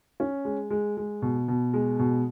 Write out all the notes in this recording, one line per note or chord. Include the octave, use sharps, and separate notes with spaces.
C#4
G#3
G#3
G#3
B2
B2
G#3
B2